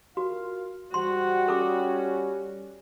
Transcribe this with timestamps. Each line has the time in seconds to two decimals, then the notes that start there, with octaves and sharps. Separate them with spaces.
0.17 F4 F#4 A#4 F5
0.94 G#2 G3 F#4 C5 F#5 C6
1.48 C#4 A4 D6